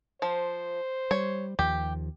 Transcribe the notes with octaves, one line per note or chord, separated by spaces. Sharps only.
F3 C5
G3 C#5
D#2 F3 G4